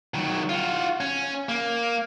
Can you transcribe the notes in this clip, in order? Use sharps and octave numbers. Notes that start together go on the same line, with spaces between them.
D#3 F#3
F4 F#4
C#4
A#3